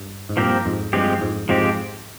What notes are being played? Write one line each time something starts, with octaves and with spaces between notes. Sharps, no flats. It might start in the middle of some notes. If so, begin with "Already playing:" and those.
Already playing: G2
G#2
G2 A#2 F3 C4 G4 A#4
F2 G#2
G2 F3 G#3 C4 G4
F2 G#2
F2 G#2 F3 G#3 C4 G4